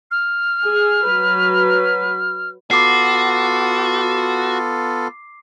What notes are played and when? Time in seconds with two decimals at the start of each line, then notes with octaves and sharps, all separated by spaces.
0.11 F6
0.64 G#4
1.08 F#3 B4
2.71 B3 F4 F#4 A4 D6 C7